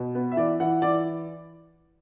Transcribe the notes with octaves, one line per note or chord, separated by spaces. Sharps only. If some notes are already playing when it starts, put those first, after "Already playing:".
Already playing: B2
B3
E5
E3 D5
E3 F#5
E3 D5